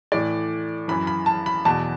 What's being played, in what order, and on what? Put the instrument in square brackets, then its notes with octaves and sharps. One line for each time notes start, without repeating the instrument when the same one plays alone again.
[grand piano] A2 E3 D5
F#2 E3 B5
B5
A5
B5
E2 B2 A5